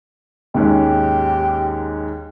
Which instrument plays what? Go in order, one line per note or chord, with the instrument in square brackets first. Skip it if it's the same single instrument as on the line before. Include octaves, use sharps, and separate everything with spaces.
[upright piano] D#2 G#2 C#4 [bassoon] G4